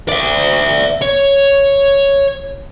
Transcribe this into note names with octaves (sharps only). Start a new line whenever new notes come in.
D5 E5
C#5